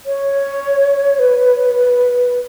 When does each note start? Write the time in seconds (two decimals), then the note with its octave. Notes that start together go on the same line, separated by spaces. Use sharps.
0.06 C#5
1.19 B4